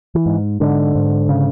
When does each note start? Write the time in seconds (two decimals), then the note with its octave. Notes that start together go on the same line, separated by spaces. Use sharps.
0.15 E3
0.26 G#2
0.60 G#2 D3
0.95 G#2
1.29 C#3